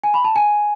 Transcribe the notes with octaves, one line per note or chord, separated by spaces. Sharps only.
G#5
B5
A5
G#5